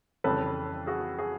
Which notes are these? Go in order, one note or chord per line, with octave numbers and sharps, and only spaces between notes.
F2 C#3 E3 G3 A4 B4
F#4 G#4
F#4 G#4